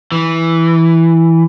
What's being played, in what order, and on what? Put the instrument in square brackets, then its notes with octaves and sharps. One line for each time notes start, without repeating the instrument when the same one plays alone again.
[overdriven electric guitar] E3